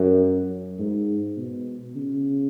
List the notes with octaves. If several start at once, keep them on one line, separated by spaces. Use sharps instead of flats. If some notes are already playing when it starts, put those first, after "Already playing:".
Already playing: F#2
G#2
B2
C#3